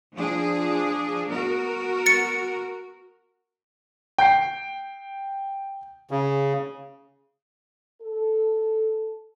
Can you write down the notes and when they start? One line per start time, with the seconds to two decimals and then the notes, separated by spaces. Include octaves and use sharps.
0.17 F3 D4 G#4
1.31 B3 F#4 A#4
2.06 A6 C#7
4.18 G5 G6 C7
6.11 C#3
8.01 A4